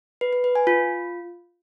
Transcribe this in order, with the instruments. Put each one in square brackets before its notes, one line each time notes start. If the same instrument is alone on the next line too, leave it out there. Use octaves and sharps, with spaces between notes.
[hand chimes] B4
B4
B4
G#5
F4